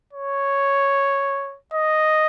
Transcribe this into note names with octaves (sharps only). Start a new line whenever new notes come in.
C#5
D#5